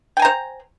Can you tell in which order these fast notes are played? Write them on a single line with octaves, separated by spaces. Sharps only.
G5 G#5 A#5 C5